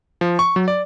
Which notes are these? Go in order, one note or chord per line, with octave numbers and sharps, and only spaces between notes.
F3
C#6
F#3
D5